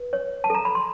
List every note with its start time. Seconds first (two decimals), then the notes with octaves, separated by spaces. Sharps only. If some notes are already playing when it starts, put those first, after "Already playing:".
Already playing: B4
0.13 C#5
0.44 A5
0.50 A4 A#5
0.65 B5
0.75 C6